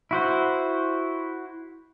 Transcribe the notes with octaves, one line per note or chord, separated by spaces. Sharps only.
E4 F#4 C5